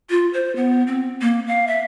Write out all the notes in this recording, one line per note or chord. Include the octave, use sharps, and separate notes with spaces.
F4
C5
B3
C4
A#3
F5
E5